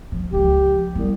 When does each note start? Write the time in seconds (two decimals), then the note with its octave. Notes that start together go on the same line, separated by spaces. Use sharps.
0.12 F3
0.32 C#2 F3 G4
0.95 C2 B3